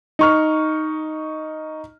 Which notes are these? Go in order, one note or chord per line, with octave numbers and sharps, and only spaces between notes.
D#4 C#6 F6